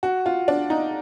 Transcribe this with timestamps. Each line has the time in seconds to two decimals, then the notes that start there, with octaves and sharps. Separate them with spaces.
0.03 F#4
0.26 F4
0.48 D4
0.70 D#4